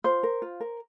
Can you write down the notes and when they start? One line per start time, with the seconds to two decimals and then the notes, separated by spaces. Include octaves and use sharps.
0.04 F4 C5
0.23 A#4
0.42 F4
0.60 A#4